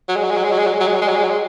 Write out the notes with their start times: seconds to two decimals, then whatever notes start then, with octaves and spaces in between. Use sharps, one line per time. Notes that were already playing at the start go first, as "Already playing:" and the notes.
0.09 F#3
0.16 G#3
0.23 F#3
0.31 G#3
0.37 F#3
0.44 G#3
0.52 F#3
0.58 G#3
0.66 F#3
0.73 G#3
0.80 F#3
0.88 G#3
0.95 F#3
1.02 G#3
1.08 F#3
1.16 G#3
1.24 F#3
1.30 G#3